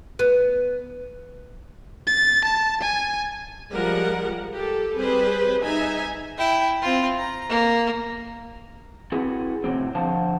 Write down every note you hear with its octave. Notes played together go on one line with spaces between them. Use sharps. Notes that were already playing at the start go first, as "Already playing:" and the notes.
B3
A6
A5
G#5
F3 G3 G#3 A#4 F#5
G4 A4
G3 C4 G#4 B4 C5
D#4 E5 G#5
E4 G5
C4 F4
A#5
A#3
C4 E4 F#4 G#4 A4 B4
A2 C3 F#3 G3 C4
B2 D3 F3 C5 F5 A5